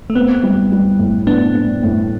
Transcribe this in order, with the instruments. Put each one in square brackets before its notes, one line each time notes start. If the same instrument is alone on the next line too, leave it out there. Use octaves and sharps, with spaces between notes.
[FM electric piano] A3
[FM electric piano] B3 [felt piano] C4
[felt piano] G3
G3
A2
[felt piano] A2 [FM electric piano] B3 D4
[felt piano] A2
A2